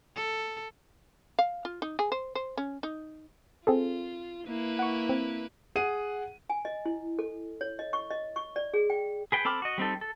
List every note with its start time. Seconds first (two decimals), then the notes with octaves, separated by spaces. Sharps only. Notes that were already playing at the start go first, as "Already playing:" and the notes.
0.16 A4
1.39 F5
1.65 F4
1.82 D#4
1.99 G#4
2.12 C5
2.35 C5
2.57 C#4
2.83 D#4
3.67 C4 F4 G#4 A4
4.45 A#3 E4 B4
4.79 F#5 C#6
5.09 C4
5.76 G#4 F#5 D#7
6.50 G#5
6.65 D#5
6.86 E4
7.19 A4
7.61 C#5
7.79 D#5
7.93 C#6
8.11 D#5
8.36 C#6
8.56 D5
8.74 G#4
8.90 G5
9.32 G#4 B4 G5
9.45 C4 A4 B5 D6 F6
9.62 F#4 D#5
9.78 G3 C4 D#4 A4
10.01 A4